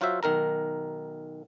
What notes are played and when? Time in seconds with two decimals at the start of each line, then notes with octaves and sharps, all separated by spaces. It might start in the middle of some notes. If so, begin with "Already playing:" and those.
0.01 F#3 F4 F#4 C5 E5
0.23 B1 D#3 A#4 A#5